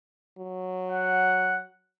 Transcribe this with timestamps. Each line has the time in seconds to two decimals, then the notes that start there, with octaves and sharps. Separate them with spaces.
0.38 F#3
0.90 F#5